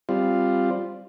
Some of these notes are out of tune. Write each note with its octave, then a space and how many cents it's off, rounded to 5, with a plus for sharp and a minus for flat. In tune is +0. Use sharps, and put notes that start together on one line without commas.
G3 +0 C4 +0 F4 +0